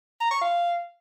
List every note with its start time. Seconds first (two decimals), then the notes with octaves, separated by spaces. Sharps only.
0.20 A#5
0.31 C#6
0.41 F5